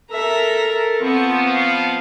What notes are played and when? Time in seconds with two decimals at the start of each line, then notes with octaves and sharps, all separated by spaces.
0.11 A4 A#4 E5 A#5
1.00 F3 B3 C4 C#6
1.50 F5